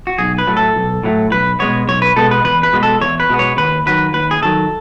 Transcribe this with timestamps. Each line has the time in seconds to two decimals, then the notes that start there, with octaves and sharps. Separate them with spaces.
0.07 F#4
0.18 B1 G#4
0.38 B4
0.47 A2 F#3 A3
0.57 A4
0.76 B1
1.04 A2 F#3 A3
1.31 B1 B4
1.59 B2 G#3 B3 C#5
1.88 B1 C#5
2.02 B4
2.16 B2 G#3 B3 A4
2.31 B4
2.44 E2 B4
2.63 B4
2.73 B2 G#3 B3
2.83 A4
3.01 E2 C#5
3.20 B4
3.30 B2 G#3 B3
3.39 C#5
3.57 D#2 B4
3.86 D#3 F#3 B4
4.14 D#2 B4
4.31 G#4
4.42 D#3 F#3 A4